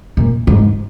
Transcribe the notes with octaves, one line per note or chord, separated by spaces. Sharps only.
A#2
G#2